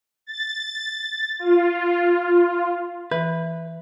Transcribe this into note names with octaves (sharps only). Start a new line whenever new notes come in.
A6
F4
E3 B4